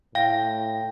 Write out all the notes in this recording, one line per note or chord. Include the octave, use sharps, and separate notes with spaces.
A2 F5 G5 A#6